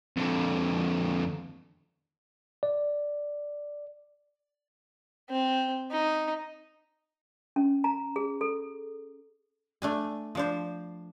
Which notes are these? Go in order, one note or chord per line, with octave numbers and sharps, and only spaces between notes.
F2 D3
D5
C4
D#4
C#4
A#5
G#4
A4
A3 D4 G#5
F3 D4 C5